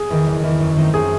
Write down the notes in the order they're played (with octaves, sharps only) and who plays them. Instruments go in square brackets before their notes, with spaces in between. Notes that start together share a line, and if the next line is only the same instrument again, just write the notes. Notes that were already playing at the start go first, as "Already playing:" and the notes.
Already playing: [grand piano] G#4
[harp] E2 D#3
F#1
E2 D#3
F#2
D#3 A3 C4 D#4
[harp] F#2 [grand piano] G#4